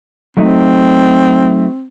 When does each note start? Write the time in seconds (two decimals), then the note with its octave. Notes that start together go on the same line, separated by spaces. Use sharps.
0.37 F#3 A3 C4 D#4